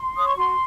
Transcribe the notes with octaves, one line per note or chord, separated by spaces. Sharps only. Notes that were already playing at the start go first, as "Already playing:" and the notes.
Already playing: C6
C#5 D#6
C#6
F#4 C6